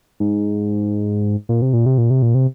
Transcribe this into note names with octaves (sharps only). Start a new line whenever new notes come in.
G#2
A#2
C3
A#2
C3
A#2
C3
A#2
C3